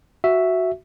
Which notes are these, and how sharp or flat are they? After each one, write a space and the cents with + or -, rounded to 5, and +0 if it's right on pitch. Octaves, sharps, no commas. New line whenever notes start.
F#4 +0 E5 +0